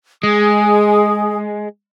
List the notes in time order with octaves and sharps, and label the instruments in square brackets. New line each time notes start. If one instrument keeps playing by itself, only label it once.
[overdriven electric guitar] G#3 [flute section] G#4 G#5 D#6